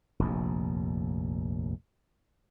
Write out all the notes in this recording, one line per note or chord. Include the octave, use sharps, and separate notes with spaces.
F1 A#1 D#2